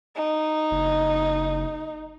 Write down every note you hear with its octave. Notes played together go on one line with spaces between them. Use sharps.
D#4
F#1